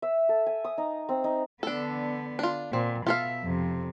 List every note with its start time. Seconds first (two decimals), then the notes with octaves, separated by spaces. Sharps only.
0.02 E5
0.29 A4
0.46 G#5
0.64 D#6
0.78 D#4
1.09 C4
1.24 D#4
1.63 D3 B3 D4 A4
2.39 D4 F4
2.73 A#2 C4
3.07 B2 F4 A4 E5 F5
3.43 F2 C3